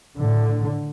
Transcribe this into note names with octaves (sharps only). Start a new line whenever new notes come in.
A2 D3